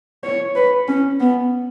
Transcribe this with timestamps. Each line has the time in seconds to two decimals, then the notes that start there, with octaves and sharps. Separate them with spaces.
0.24 C#5
0.56 B4
0.88 C#4
1.20 B3